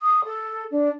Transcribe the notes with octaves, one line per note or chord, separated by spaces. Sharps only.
D#6
A4
D4